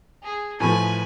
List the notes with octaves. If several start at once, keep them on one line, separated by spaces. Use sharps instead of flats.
G#4
A2 F3 B4 G#5